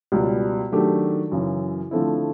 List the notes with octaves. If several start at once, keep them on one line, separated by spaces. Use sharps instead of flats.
C#2 B2 G3
D#3 F#3 A3 D4 G4
F#2 C#3 E3
D3 F3 A3 C4 E4